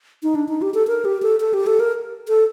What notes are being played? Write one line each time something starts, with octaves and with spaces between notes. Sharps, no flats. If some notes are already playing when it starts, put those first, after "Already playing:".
D#4
D4
D#4
G4
A4
A#4
G4
A4
A4
G4
A4
A#4
A4